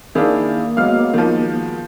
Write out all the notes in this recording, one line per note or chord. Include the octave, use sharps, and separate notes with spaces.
D#3 A#3 D4 E4 G#4 F5
F#3 G#3 B3 F5 F6
D#3 F3